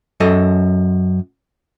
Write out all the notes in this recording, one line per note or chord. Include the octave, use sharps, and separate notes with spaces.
F#2 A4 D#5